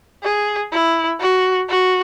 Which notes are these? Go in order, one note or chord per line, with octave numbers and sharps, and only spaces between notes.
G#4
E4
F#4
F#4